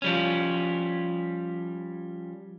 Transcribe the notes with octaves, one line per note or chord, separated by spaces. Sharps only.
F3 G3 C#4